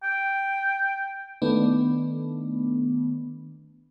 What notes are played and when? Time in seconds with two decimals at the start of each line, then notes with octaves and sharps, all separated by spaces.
0.03 G5
1.42 D#3 A3 B3 D4